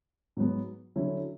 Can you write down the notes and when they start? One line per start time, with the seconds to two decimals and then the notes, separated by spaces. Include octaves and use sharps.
0.37 G#2 F#3 B3
0.96 D3 F#3 C#4 E4